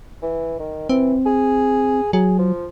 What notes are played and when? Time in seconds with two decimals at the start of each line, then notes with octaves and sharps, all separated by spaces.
0.22 E3
0.59 D#3
0.89 E3 C4
1.26 G#4
2.13 F#3 G#4
2.39 F3